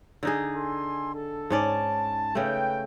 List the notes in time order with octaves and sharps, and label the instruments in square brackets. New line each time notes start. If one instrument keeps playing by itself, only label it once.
[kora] D3 D#4 G#4
[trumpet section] A4 G#5 C6
A4
[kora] G#2 C#4 D5 [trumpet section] A5
[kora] C#3 A3 [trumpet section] B4 G5